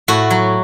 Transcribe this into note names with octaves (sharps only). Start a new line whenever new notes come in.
A2 F#4
F#3